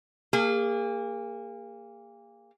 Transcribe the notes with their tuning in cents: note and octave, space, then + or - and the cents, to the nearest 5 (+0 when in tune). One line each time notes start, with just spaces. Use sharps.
A#3 -10 G#4 -40